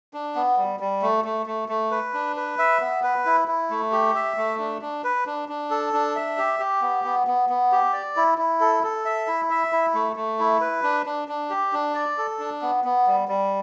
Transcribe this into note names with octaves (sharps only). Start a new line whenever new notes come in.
D4
B3
G3
G3
A3
A3
A3
A3
B4
D4
B4
E5
B3
B4
E4
E4
A3
G4
E5
A3
D4
D4
B4
D4
D4
A4
D4
E5
G4
G4
B3
B3
B3
B3
G4
D5
E4
E4
A4
A4
E5
E4
E5
E4
A3
A3
E4
B4
D4
D4
D4
G4
D4
D5
A4
D4
B3
B3
G3
G3